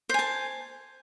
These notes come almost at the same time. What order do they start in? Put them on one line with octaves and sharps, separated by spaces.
C5 G#5 A5